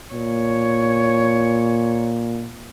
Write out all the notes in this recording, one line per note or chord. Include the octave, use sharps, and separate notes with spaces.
A#2 C#5